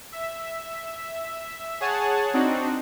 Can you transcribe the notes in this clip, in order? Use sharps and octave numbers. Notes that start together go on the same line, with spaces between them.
E5
G#4 C#5 F#5 G#5 A5
C4 D4 D#4 F#4